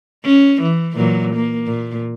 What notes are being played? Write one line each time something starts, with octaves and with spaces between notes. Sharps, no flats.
C#4
E3
A#2 E3 F#3
A#3
A#2